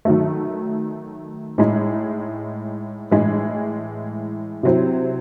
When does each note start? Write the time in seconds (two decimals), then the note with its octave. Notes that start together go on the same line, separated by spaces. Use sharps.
0.05 D#3 F#3 A3
1.58 A2 G#3 D#4
3.11 A2 E3 G#3
4.63 C3 F#3 C4 E4